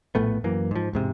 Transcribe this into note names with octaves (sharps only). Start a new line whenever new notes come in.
A#1 A2 A3 B3
F#2 E3 A#3
G#2 F3
E1 G#2 C3